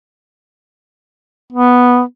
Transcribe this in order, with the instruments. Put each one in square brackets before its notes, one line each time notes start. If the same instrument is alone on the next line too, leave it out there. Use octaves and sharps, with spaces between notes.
[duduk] B3